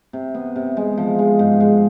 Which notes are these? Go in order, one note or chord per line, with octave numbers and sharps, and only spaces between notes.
C3
B3
C3
G#3
F3
G#3
G#2
G#3